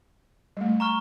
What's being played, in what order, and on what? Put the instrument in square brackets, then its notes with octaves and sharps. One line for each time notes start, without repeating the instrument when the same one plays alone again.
[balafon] G3 A3
[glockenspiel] A#5 C#6 F6